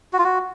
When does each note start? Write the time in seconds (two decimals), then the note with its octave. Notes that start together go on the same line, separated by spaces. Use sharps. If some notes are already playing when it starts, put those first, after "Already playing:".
0.13 F#4
0.18 F4
0.24 F#4